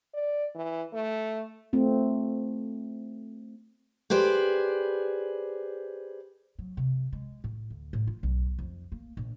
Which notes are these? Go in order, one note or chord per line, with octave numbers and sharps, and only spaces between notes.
D5
E3
A3
A3 C4 F4
G4 G#4 B4 C5 D5
F#3
C3
G#3
A2
D2
A2
F4
B1
F2
A#3
A#1